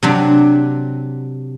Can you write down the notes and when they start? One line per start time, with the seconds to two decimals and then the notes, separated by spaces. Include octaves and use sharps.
0.03 C3 F#3 D4